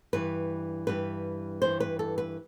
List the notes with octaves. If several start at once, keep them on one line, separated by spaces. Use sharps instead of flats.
G2 E3 G3 B4
G2 E3 G3 B4
G2 E3 G3 C5
B4
A4
B4